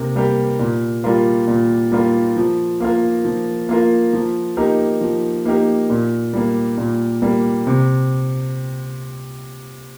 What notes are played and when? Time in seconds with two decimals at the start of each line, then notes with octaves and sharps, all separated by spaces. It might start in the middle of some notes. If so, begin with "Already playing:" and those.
Already playing: C3 A#3 A#4
0.16 G3 A#3 G4 A#4
0.59 A#2
1.04 G3 A#3 F4 A#4
1.47 A#2
1.92 G3 A#3 F4 A#4
2.37 F3
2.80 A#3 F4 A#4
3.25 F3
3.69 A#3 F4 A#4
4.13 F3
4.57 A#3 D#4 G4 A#4
5.01 F3
5.45 A#3 D#4 G4 A#4
5.90 A#2
6.33 G3 A#3
6.78 A#2
7.22 G3 A#3
7.67 C3